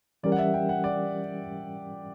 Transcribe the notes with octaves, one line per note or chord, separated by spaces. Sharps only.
E3 G3 C#4 G4 A#4 D5
F#5
E5
G5
F#5
D5